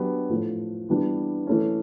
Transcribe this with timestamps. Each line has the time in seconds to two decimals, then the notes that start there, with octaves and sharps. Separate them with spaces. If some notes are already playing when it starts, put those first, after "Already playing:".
Already playing: F#3 B3 D4 G4
0.30 A2 F3 A3
0.89 E3 G3 B3 D4
1.47 E3 A3 C#4